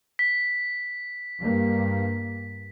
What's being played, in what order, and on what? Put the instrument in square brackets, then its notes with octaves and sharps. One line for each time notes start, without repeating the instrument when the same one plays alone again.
[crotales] B6
[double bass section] G2 A#3